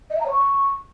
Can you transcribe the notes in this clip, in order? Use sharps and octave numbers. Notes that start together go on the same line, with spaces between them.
D#5
E5
A#5
C#5
C#6